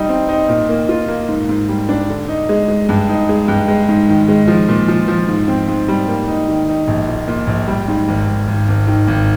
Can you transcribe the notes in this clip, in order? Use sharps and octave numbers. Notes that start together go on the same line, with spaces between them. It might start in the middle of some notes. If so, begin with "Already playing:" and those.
Already playing: G3 D#4
C4
D#4
A#2
A#3
F4
A#3
G#2
G#2
G3
D4
D3
D#4
G#3
G#3
G2
D#4
G#3
G2
G#3
G#2
D#3
G#3
F3
A#2
F3
F3
G#2
C4
G#2
G3
A#3
D#4
D#3
D#4
A#1
A#2
A#2
A#1
G3
G#2
G#1
G#1
G#1
G#1
D#3
G#1